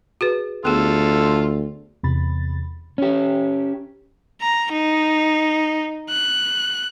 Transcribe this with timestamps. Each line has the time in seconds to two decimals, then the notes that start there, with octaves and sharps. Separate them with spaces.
0.21 F#4 G#4 B4
0.65 D2 B3 F4 G#4 A4
2.03 E2 C3 B5 A6
2.98 C#4 G4
4.41 A#5
4.73 D#4
6.10 F#6